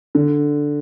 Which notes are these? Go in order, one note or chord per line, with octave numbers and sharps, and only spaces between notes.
D3